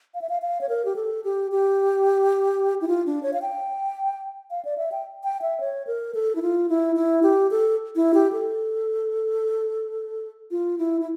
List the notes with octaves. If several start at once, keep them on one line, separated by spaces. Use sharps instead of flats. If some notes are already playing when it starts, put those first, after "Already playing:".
F5
E5
F5
F5
C#5
A#4
G4
A4
G4
G4
E4
F4
D4
C#5
F5
G5
F5
D5
E5
G5
G5
E5
C#5
A#4
A4
E4
F4
E4
E4
G4
A4
E4
G4
A4
F4
E4
E4